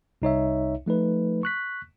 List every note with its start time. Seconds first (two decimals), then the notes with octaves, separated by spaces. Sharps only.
0.22 C2 D#4 C#5 E5
0.86 F3 A3 D#4 B4
1.43 C#6 F#6 B6